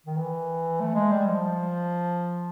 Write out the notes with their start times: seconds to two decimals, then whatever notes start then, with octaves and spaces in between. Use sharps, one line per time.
0.06 D#3
0.17 E3
0.80 A3
0.95 G#3
1.11 G3
1.26 F3